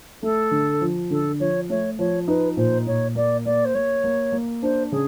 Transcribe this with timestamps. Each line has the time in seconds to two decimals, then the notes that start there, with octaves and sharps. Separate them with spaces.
0.22 A3 A4
0.51 D3
0.81 F3
1.11 D3 A4
1.40 F3 C#5
1.69 A3 C#5
1.98 F3 C#5
2.28 D#4 B4
2.57 A#2 C5
2.86 A#2 C#5
3.15 A#3 D5
3.45 A#3 D5
3.65 C5
3.74 A#3 C#5
4.04 A#3
4.32 A#3
4.62 D4 C5
4.91 C#3 G#4